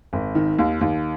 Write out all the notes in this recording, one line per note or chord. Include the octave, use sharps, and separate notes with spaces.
G#1
D#3
D#2
D#2